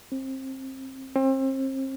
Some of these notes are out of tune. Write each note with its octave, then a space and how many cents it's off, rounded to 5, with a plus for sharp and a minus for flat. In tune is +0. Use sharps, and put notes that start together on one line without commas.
C4 +25
C4 +35